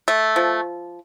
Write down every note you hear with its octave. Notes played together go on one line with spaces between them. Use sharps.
A3
F3